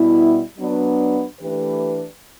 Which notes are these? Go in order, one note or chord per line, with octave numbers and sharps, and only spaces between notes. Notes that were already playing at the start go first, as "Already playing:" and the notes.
Already playing: B2 G3 B3 E4
F#3 B3 D4
E3 A3 D4 G4 B4